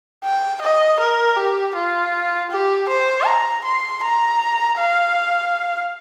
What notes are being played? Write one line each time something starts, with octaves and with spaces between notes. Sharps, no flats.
G5
D#5
A#4
G4
F4
G4
C5
A#5
C6
A#5
F5